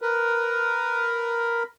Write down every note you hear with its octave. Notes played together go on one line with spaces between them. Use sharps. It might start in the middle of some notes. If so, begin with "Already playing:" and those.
A#4 B4